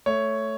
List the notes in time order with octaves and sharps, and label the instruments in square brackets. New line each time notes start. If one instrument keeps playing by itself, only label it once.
[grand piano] A3 C#5